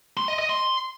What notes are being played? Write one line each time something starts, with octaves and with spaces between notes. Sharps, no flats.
C6
D#5
D#5
C6